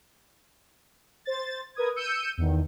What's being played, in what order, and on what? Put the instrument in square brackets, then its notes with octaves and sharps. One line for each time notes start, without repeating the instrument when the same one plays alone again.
[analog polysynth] C5 A6
A#4 B4 D#6 G#6
E6 G6 C#7 D#7
E2 D#3